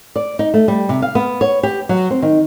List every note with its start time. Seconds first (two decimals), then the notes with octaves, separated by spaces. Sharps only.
0.16 D5
0.39 D#4
0.54 A3
0.68 G3
0.89 C3
1.02 F5
1.15 B3
1.41 C#5
1.63 G4
1.89 F#3
2.10 C4
2.22 D#3